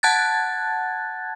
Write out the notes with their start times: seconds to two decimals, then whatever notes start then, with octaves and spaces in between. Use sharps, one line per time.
0.03 F#5 A5 F#6 G#6 A6